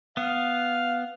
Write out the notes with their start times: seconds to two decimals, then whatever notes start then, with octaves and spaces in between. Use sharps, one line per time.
0.17 B3 F5